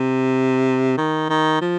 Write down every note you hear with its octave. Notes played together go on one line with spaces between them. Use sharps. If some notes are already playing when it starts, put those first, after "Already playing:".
Already playing: C3
D#3
D#3
F3